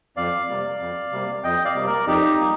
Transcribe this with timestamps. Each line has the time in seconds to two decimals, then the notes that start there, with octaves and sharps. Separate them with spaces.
0.17 F2 D5 F5
0.49 C3 G3 A#3
0.80 F2
1.12 C3 G3 A#3
1.44 F2 D#5 G5
1.65 D5 F5
1.75 C3 G3 A#3
1.86 A#4 D5
2.07 F2 D#4 G4
2.39 G3 A#3